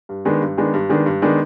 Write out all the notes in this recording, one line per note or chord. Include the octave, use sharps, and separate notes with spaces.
G2
D#3 G#3 B3 D4
G2
D#3 G#3 B3 D4
G2
D#3 G#3 B3 D4
G2
D#3 G#3 B3 D4